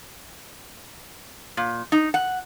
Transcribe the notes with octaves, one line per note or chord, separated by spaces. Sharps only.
A#2
D#4
F#5